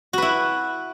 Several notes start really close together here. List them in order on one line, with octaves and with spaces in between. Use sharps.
F#4 B4 E4